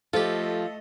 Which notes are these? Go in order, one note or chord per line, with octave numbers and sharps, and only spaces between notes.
F3 A3 F4 G4 A4 D#5